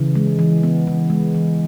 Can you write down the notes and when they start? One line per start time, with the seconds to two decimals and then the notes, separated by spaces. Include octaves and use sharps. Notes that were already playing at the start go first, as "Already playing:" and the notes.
Already playing: C#3 E3
0.15 G#3
0.39 E3
0.63 B3
0.87 E3
1.10 G#3
1.35 E3